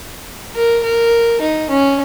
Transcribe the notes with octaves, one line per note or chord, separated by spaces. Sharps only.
A#4
A#4
D#4
C#4